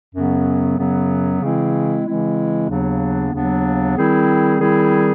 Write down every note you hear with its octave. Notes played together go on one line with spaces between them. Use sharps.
F#2 C#3 F#3 B3
F#2 C#3 F#3 B3
C#3 E3 G#3 C4 E4
C#3 E3 G#3 C4 E4
D#2 C#3 F#3 B3 D4
D#2 C#3 F#3 B3 D4
D#3 G3 C4 E4 G#4
D#3 G3 C4 E4 G#4